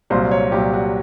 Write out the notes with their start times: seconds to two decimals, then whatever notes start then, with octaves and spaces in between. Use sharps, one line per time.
0.10 C2 A#2 F#3 C5
0.31 C#5
0.52 C2 A#2 F#3 G4
0.74 F#4